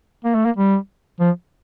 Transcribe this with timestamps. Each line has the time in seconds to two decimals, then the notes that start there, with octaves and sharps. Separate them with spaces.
0.25 A#3
0.35 A3
0.45 A#3
0.57 G3
1.20 F3